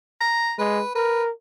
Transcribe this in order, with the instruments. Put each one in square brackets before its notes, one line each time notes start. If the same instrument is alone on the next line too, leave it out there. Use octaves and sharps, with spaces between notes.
[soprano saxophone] A#5
[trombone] G#3 [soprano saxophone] B4
[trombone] A#4 [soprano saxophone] B4